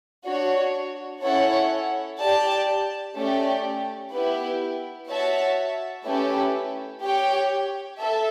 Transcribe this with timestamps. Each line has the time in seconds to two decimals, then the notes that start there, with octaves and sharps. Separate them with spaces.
0.24 D4 F#4 C#5
1.21 C#4 E4 A4 C#5 F#5
2.17 G4 D5 A5
3.15 A3 C#4 G4 D5
4.11 B3 E4 G4 B4
5.08 F#4 C#5 E5 A5
6.05 A3 C#4 E4 G4 B4
7.02 G4 C#5 G5
7.99 A4 E5